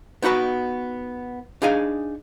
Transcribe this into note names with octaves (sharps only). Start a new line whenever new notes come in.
B3 D#4 F#4 B4 A5
D4 D#4 G#4 F5 G#5